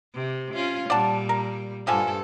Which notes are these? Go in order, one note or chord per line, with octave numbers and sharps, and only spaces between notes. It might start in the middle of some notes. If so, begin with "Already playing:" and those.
C3
C#4 F4
A#2 G3 D5 F#5 A5
A#4
G2 D3 F3 A4 G#5